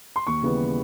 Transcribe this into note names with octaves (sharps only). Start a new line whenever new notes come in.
C6
D#2 C#6
C#3 E3 G3 B3